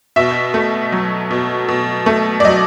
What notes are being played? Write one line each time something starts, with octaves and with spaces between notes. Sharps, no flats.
B2 E5
A3
F#3
B2
B2
A3
D5
F#3 D#5